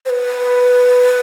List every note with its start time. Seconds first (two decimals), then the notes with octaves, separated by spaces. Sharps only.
0.06 C5
0.10 B4